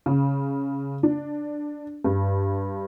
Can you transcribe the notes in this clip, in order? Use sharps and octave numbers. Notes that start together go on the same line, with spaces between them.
C#3
D4
G2